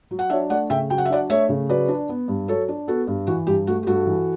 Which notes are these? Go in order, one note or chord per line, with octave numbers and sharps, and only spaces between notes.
F#3
F#5
D4 C#5 E5
A3 D5 F#5
C#3 E5 G5
F#3 G5
F#5
E5
D4 D5 F#5
A3 C#5 E5
C#3
F#3 B4 D5
D4
B3
G2
F#3 A4 C#5
D4
B3 F#4 A4
G2
E3 F#4
G2 G4
A3 F#4
G4
G2 F#4 A4
E3